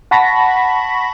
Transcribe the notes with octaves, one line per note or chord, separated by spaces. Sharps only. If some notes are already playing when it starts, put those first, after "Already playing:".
F#5 A5 B5 C#6 A#6 B6